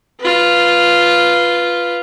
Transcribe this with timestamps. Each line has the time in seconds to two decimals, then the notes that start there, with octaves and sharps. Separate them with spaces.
0.20 F4 B4